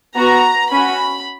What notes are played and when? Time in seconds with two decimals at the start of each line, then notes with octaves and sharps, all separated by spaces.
0.16 B3 F#4 A#5
0.71 C#4 F#4 B5